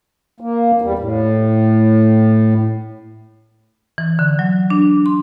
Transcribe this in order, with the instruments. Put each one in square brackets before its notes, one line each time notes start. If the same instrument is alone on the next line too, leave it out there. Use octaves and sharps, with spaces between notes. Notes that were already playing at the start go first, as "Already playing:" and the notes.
[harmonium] A#3
E2 G3
A2
[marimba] E3
D3
F#3
D4
C6